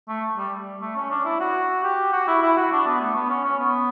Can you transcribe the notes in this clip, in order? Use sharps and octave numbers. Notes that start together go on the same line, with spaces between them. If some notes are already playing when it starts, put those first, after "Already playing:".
A3
G3
A3
C#4
D4
E4
F#4
G4
F#4
E4
E4
F#4
D4
B3
A3
B3
C#4
C#4
B3